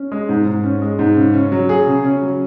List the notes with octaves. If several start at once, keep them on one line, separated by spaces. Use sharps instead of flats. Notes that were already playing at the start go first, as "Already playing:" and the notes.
Already playing: C#4
G#3
G#2
G#2
C#4
G#3
G#2
C#3
C#4
F#3
G#4
C#3
C#4
F#3